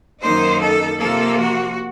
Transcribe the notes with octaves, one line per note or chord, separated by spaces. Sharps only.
F#2 D#3 A#3 D#4 C5
A4
C3 F3 A#3 A4
F#4